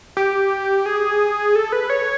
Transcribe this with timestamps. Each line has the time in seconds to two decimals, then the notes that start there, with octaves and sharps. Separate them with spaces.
0.17 G4
0.86 G#4
1.56 A4
1.72 B4
1.90 C#5